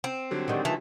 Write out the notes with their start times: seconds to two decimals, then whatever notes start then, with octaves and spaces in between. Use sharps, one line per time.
0.04 C4
0.31 D3 F#3 G3
0.48 D#3 G#3 F#4 G4 D5 F#5
0.65 E3 F4 A5